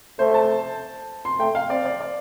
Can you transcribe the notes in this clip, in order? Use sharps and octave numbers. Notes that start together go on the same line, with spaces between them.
A3 C5
A5
C6
A3 G5
F5
C4 D5
D5
D5